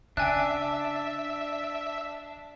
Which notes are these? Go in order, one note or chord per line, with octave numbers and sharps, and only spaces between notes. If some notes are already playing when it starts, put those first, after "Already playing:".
C#3 D4 E5 G5 G#5 F#6